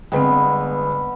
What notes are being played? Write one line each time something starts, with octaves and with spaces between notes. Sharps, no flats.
G1 G#3 B3 C4 B4 G5